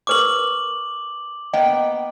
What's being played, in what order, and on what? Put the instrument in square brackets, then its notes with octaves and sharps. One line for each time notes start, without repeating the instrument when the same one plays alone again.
[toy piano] A#4 B4 C#6 [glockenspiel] D6 F#7
[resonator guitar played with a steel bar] A#3 B3 G5 [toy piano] D#5